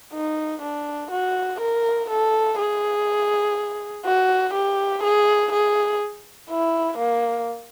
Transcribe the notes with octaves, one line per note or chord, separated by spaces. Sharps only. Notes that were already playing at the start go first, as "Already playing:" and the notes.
D#4
D4
F#4
A#4
A4
G#4
F#4
G4
G#4
G#4
E4
A#3